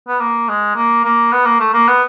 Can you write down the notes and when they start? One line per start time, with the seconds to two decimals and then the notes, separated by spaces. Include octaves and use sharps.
0.08 B3
0.20 A#3
0.49 G#3
0.75 A#3
1.05 A#3
1.32 B3
1.46 A#3
1.60 A3
1.74 A#3
1.88 B3